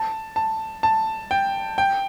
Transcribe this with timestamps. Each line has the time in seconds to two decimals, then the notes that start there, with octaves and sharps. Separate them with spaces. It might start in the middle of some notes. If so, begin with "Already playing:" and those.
Already playing: A5
0.36 A5
0.83 A5
1.31 G5
1.78 G5